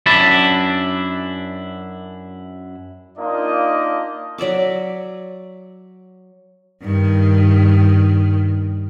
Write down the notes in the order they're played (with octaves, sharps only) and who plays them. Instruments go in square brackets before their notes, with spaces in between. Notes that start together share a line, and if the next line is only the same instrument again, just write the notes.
[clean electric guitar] F#2 D4 E4 A5 B5
[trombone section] A#3 D4 F4 [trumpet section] D#4 D5 D#5
[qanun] F#3 D5 E5 D6
[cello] G2 D#3